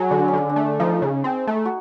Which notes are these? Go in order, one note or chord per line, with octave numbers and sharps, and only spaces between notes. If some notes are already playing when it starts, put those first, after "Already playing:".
Already playing: F#3 G#4
D3
D4
C#4
D3 D4
D4
A3
F3 D#4
C#3
C4 G#4
A3
F#4